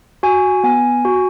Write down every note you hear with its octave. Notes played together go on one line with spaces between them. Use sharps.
F#4 G#5
B3 G#5
F#4